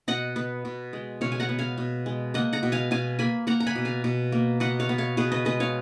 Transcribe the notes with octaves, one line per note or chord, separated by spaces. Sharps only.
B2 D#5 F#5
B3
B2
G#3
B2 C#5 F5
G#5
F#5 A#5
B3
F5 G#5
B2
G#3
A#3 D#5 F#5
F#5 A#5
B2
F5 G#5
B2 F5 G#5
A#3 G#5 B5
A#3 F#5 A#5
A#5
G#5 B5
B2
F5 G#5
B2
A#3
B2 D#5 F#5
C#5 F5
B3
C#5 F5
B2 G#4 B4
B4 D#5
G#3 B4 D#5
C#5 F5